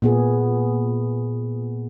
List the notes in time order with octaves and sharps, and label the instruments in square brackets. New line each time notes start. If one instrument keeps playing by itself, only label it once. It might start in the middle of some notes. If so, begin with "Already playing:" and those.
[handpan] A#2 B3 G#4